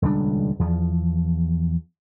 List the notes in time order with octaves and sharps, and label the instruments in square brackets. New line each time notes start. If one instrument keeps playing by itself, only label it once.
[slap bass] D#1 C#2 G3 D4
E2 F3